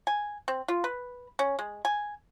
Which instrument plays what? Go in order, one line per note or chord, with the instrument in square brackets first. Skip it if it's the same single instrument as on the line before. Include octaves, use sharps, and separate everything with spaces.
[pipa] G#5
C4
F4
B4
C#4
G#3
G#5